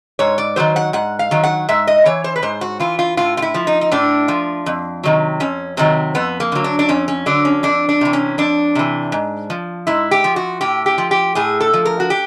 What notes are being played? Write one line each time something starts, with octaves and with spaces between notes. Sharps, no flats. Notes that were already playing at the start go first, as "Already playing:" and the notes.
G#2 C#5
D5
D#3 F#3 C5
F#5
G#2 F#5
F5
D#3 F#3
F#5
G#2 E5
D#5
E3 C#5
C5
B4
G#2 C5
F#4
E3 F4
F4
A2 F4
F4
E4
F3
D#4
D#4
A2 D4
F3
F2
C3 D#3 F#3
F2 C#4
C3 D#3 F#3 C4
F2 B3
A#3
D3 F#3
D4
D4
F2 C#4
C#4
D3 F#3 D4
C#4
F2 D4
D4
C3 E3
C#4
F2 D4
C3 E3
G#2
F3
G#2 E4
G4
F3
F#4
A2 G4
G4
F3
G4
A2 G#4
A4
F3
A#4
F#4
G4